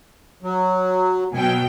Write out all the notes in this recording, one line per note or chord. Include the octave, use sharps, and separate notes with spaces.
F#3
B2 F#3 G5 G#5